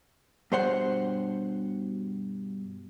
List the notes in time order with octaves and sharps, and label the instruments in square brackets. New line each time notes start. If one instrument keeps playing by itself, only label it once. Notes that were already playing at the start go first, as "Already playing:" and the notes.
[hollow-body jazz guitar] G2 B2 C5 C#5 F#5 C6